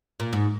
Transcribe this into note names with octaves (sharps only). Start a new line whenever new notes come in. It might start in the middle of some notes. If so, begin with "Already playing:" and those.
A#2
G#2